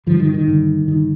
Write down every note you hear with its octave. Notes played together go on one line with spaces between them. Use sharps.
G2 D3 F3
D#3
D#3
G2 D3
G2 D3 D#3